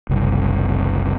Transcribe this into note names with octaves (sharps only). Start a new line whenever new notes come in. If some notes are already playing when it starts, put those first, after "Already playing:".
F#1 C2